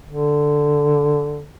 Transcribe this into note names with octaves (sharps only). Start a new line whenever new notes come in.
D3